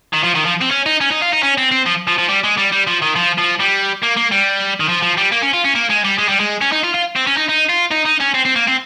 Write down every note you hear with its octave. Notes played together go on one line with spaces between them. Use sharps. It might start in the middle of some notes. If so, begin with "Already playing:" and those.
D#3
F3
D#3
F3
C4
C#4
D#4
C#4
D#4
F4
D#4
C#4
C4
C4
F3
F3
F3
G3
G#3
G3
G3
F3
D#3
F3
F3
G3
A#3
A#3
G3
D#3
F3
F3
G3
A#3
C#4
F4
C#4
A#3
G#3
G3
G#3
G3
G#3
C#4
D#4
F4
F4
C4
C#4
D#4
D#4
F4
D#4
D#4
C#4
C4
C4
A#3
C4